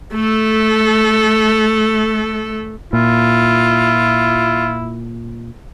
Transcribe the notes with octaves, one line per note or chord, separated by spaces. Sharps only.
A3 A4
A#2 E4 F4